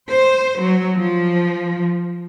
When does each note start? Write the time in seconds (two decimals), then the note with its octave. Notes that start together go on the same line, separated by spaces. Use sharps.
0.10 C5
0.61 F#3
0.97 F3